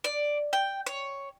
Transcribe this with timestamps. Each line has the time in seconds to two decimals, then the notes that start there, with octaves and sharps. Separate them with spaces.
0.04 D5
0.53 G5
0.87 C#5